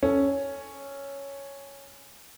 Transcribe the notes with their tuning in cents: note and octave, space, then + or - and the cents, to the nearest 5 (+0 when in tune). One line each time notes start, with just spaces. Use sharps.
C#4 +0 A4 +0